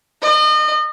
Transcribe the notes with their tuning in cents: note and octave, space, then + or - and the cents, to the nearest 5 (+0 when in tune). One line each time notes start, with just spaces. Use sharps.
D#5 -35